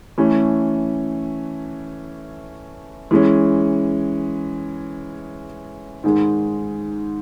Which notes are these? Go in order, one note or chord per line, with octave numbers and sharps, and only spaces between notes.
E3 A3 C#4
E3 G#3 C#4
G#2 D#3 G#3